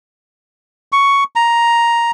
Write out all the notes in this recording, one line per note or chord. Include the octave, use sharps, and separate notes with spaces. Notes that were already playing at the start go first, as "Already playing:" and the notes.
C#6
A#5